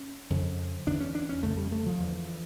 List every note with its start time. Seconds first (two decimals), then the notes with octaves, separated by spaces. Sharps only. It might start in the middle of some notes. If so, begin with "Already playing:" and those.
Already playing: C#4
0.30 F2 C#3
0.87 E2 D3 D4
1.00 C#4
1.15 D4
1.29 C#4
1.43 F2 C#3 A3
1.57 G3
1.72 A3
1.86 F3
2.00 E2 D3